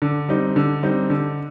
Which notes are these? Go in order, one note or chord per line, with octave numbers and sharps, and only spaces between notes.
D3
G3 C4 D#4
D3
G3 C4 D#4
D3